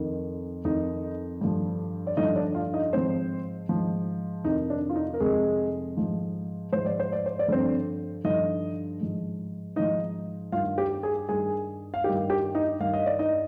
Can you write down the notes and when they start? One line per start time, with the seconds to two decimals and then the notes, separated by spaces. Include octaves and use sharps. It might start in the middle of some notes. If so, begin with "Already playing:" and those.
Already playing: F2 D#3
0.65 F2 D#3 D#4 D#5
1.41 G2 D3 F3
2.07 D5
2.17 G2 D3 F3 D#4 D#5
2.36 D4 D5
2.55 F4 F5
2.74 D#4 D#5
2.93 G#2 F3 C4 C5
3.69 G#2 F3
4.44 F2 C3 D#3 D#4
4.70 D4
4.89 F4
4.95 D#4
5.14 A#4
5.20 F2 C3 D#3 G#3 G#4
5.97 G#2 F3
6.73 G#2 F3 C5
6.86 D5
7.00 C5
7.13 D5
7.26 C5
7.39 D5
7.48 G2 D3 F3 C4 C5
8.24 G2 D3 F3 D#4 D#5
9.01 G#2 F3
9.76 G#2 F3 D#4 D#5
10.52 G2 D#3 F4 F5
10.78 G4 G5
11.03 G#4 G#5
11.29 G2 D#3 G#4 G#5
11.94 F5
12.04 G2 D#3 G4 G5
12.30 G4 G5
12.55 D#4 D#5
12.80 G2 D#3 F5
12.94 D#5
13.06 D5
13.19 D#4 D#5